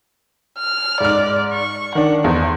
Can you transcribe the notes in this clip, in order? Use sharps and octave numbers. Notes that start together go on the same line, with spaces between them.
F6
G#2 D5 F6
C#6
D#3 D4 F#5
E2 C5